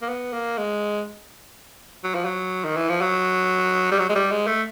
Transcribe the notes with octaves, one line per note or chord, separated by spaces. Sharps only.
A#3
B3
A#3
G#3
F#3
F3
F#3
D#3
E3
F3
F#3
G3
F#3
G#3
G3
G#3
A3